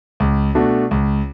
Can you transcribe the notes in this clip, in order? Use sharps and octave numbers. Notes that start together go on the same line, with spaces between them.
C#2
B2 A3 D4 F#4
C#2